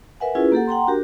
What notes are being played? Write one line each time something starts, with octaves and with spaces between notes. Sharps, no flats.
A#4 B4 E5 F#5 G#5
C#4 E4 F4 G#4 B4
A#3 G4 A4 F#5
F#5 G5 A#5 C6
D4 F#4 G4 A#4